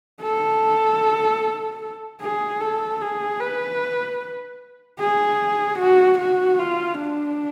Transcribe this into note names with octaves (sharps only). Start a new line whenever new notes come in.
A4
G#4
A4
G#4
B4
G#4
F#4
F#4
F4
D4